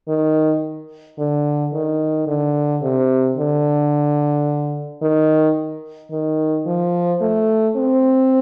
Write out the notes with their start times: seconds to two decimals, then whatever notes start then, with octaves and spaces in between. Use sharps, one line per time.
0.09 D#3
1.18 D3
1.73 D#3
2.27 D3
2.82 C3
3.37 D3
5.02 D#3
6.11 D#3
6.66 F3
7.21 A3
7.76 C4